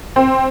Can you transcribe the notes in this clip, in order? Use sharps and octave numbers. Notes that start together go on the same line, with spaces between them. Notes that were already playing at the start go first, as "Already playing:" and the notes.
C4